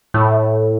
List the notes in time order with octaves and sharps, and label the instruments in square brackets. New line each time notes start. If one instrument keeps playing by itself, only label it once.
[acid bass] A2